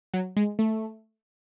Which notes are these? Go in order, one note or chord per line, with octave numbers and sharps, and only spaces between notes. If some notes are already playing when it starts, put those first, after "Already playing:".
F#3
G#3
A3